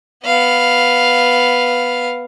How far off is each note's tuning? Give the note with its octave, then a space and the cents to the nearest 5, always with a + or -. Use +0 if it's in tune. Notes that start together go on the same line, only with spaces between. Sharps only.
B3 +0 F5 +0